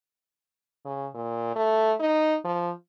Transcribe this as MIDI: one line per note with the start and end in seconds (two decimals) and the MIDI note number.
0.85 1.08 49
1.14 1.53 46
1.56 1.93 57
2.00 2.36 63
2.45 2.71 53